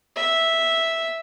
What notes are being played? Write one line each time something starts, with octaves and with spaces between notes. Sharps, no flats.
E5